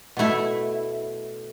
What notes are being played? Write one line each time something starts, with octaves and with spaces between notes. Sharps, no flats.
B2 A3 E4